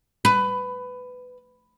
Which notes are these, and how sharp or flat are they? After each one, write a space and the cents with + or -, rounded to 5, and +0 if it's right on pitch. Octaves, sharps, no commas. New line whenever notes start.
B4 +15